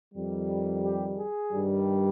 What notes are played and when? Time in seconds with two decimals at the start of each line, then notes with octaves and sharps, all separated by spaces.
0.14 F2 D#3 G3
0.83 G4
1.17 G#4
1.52 G2 D#3 G3